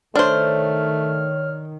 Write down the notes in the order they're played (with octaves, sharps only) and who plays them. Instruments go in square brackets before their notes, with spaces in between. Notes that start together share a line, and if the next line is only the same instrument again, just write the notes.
[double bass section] D#3 [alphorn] A3 [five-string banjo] D4 C5 [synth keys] C#5 F6